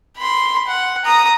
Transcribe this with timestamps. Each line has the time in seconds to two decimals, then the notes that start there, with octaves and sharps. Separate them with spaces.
0.17 B5 C6
0.67 F#5
1.05 A#5 D#6